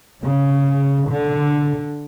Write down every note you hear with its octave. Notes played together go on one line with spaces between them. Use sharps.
C#3
D3